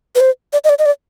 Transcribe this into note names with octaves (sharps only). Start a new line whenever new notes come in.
B4
C5
D5
D#5
D5
D#5
D5